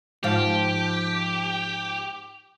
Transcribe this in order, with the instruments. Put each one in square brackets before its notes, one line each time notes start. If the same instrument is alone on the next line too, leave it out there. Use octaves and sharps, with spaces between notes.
[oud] G#2 F3 F5 [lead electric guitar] G4